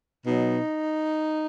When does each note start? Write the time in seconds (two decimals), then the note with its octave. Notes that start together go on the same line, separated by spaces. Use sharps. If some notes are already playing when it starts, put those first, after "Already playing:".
0.25 B2 F#3 D#4